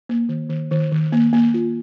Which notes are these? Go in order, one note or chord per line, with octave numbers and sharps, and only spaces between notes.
A#3
D#3
D#3
D#3
D#3
A#3
A#3
F4